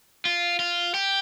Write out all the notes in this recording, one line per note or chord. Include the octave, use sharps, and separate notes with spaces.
F4
F4
G4